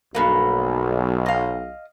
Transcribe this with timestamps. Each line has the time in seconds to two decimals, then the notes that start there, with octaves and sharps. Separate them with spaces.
0.15 B1 G2 B2 A#3
1.26 D#5 F5